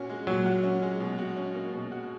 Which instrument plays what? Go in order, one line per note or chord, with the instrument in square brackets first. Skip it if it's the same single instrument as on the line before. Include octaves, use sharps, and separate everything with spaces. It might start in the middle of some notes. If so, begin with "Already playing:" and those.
Already playing: [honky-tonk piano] A#2 C#4 F#4
G#3
[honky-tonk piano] A#2 [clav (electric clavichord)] F#3
[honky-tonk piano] F#4
C#4
G#3
B2
F#4
C#4
A#3
B2
F#4